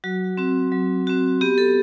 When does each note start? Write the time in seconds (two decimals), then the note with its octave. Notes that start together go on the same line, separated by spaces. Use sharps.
0.04 F#3 F#4
0.37 C4 F#4
0.72 F#3
1.07 C4 F#4
1.41 B3 G4
1.58 A4